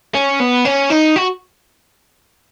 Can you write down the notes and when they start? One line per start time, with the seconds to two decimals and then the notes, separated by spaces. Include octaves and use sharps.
0.15 C#4
0.40 B3
0.65 C#4
0.90 D#4
1.16 F#4